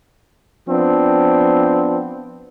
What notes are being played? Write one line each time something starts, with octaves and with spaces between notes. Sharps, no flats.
F3 B3 C4 D4